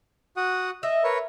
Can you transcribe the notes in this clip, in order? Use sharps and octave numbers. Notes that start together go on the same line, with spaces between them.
F#4 F#5 D#6
D#5 E5
A#4 B4 C#5